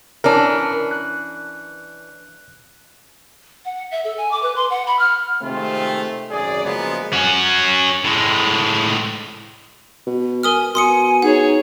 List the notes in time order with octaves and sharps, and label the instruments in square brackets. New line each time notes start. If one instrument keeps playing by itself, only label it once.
[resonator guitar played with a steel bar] E3 C#4 D4 [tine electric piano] A#4
[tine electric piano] F#6
[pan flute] F#5
E5
A4
G#5
D6
B4
C6
F#5
B5
F6
[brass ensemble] C3 D#3 G#3 A3 C4 F4
G#1 F#2 G#4 D5
C#3 F3 F#3 G#3 A#3 B3
[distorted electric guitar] C#4 F#4
A2 G#3
[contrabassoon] B2
[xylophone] A#4 D#6 F6 [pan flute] G#5
[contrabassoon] B2 [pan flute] G#5 [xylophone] C6 D#6 C#7
[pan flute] D#4 [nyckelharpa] G#4 C#5 [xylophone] F#5